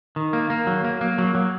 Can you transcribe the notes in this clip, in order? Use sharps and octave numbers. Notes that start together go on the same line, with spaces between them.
D#3
A#3
A#3
F#3
A#3
A#3
F#3
F#3